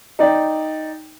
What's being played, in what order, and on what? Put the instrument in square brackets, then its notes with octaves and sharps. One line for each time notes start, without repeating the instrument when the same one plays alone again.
[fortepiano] D#4 D5 G5